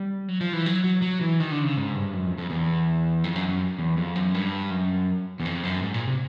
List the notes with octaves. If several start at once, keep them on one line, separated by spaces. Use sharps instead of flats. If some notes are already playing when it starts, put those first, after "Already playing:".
Already playing: G3
F#3
F3
E3
F#3
F#3
F#3
E3
D#3
D3
C#3
G#2
G2
F#2
F2
F2
E2
F2
F#2
F#2
E2
F2
F#2
G2
F#2
E2
F2
F#2
G#2
A#2
C3